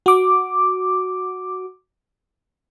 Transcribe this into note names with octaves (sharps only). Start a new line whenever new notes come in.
F#4 D6